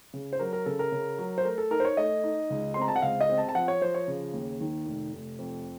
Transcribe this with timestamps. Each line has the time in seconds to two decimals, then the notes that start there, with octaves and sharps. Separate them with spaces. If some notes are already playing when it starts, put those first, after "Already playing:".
0.13 C#3
0.33 C5
0.39 F#3 A#4
0.53 A#4
0.66 C#3 A4
0.79 A#4
0.92 C#3
1.18 F#3
1.38 C5
1.45 A3 A#4
1.58 A4
1.71 D#4 A#4
1.80 C5
1.85 C#5
1.97 A3 D#5
2.24 D#4
2.50 C#2
2.74 C4 C6
2.81 A#5
2.88 A5
2.96 F#5
3.02 C#2 F5
3.21 D#5
3.29 C4
3.38 A5
3.49 A5
3.55 F3 F#5
3.68 C#5
3.81 F3 C5
3.94 C#5
4.08 C#3
4.33 D#2
4.61 D#3
4.86 F1
5.13 F1
5.38 F2